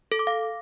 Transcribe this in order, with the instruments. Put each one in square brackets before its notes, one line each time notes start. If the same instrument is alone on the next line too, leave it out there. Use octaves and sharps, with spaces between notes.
[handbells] A4
D6
F5